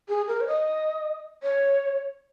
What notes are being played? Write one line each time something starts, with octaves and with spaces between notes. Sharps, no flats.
G#4
A#4
C#5
D#5
C#5